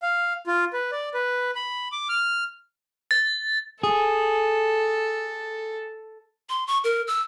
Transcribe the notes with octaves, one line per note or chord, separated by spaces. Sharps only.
F5
F4
B4
D5
B4
B5
D6
F6
A6
G#4 A4
C6
C#6
A#4
E6